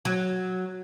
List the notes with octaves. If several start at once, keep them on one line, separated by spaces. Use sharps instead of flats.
F#3